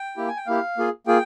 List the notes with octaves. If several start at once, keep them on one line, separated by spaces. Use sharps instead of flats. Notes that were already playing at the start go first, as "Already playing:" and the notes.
Already playing: G5
A#3 E4 G4
G#5
G5
A#3 E4 G4 F5
A#3 F4 G#4
A#3 F4 G#4 G5